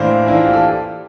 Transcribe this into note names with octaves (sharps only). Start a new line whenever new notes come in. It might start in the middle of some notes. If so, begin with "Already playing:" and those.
Already playing: A2 E3 A#3 D4 C5
E3 A#3 D4 E4
F4
G4
A4